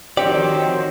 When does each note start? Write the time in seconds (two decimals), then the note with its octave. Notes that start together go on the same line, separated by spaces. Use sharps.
0.17 D#3 F3 C4 F#4 G4 C#5 D5